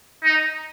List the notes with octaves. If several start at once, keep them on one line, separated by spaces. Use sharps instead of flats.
D#4